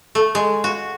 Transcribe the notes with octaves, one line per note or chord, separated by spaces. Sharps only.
A3
G#3
F#4